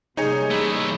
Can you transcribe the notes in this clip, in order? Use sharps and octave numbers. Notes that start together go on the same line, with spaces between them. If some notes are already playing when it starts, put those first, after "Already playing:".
C3 G3 A#3 D#4 G#4 C#5 G#5
E3 A3